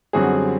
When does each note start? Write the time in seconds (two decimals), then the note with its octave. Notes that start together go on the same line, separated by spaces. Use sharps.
0.13 F#2 D3 G3 C4 F#4 G#4